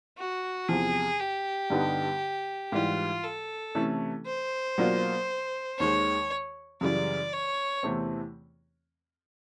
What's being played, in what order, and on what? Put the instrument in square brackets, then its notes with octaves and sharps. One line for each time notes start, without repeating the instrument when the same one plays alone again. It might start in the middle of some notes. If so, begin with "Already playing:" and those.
[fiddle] F#4
[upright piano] E2 C3 F3 [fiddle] G#4
[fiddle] G4
[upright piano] G2 D3 G3 B3 D#4
[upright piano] G#2 E3 G3 [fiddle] F4
[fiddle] A4
[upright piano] C3 E3 A3 C#4
[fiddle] C5
[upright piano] B2 F#3 A#3 D4 F4
[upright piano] D#2 D#3 G#3 [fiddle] C#5
[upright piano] F#2 C#3 E3 G3 [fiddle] D5
[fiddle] C#5
[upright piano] E2 C3 E3 A3 C4